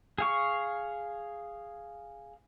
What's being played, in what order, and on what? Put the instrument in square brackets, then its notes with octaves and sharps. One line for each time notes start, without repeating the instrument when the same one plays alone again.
[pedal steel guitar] G#4 F5 C#6